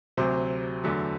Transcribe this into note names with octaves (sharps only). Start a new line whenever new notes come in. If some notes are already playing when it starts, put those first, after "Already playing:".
D2 C3 F#3 C5
E2 D3 F#3 A3